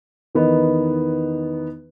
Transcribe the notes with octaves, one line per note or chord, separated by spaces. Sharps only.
E2 D#3 B3 D#4